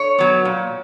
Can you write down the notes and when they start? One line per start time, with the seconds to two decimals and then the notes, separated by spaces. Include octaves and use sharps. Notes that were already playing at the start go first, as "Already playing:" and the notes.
Already playing: C#5
0.18 F#3 B3
0.45 A#2